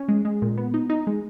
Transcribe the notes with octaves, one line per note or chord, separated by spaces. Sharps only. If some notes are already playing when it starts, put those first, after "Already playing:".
Already playing: C#4
G#3
G#3
A#2
B3
D#4
D#4
G#3